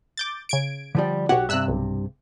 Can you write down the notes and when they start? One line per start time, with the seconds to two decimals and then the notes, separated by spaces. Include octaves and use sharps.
0.17 D6 G6 A6
0.49 C#3 G#6 D7
0.95 D3 F3 G3
1.29 B1 F#4 G4 C#5 F#5
1.49 G2 C3 E5 E6 F#6
1.68 B1